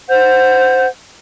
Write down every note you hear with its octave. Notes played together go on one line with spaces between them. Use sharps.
C5 F#5 G6